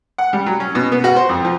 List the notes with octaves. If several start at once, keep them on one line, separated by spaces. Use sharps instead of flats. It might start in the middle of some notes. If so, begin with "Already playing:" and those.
F#5
G3
F#3
C#4
B2
B3
F#4
C5
F2
F3